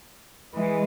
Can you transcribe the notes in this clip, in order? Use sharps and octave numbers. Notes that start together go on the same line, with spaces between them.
E3 G#3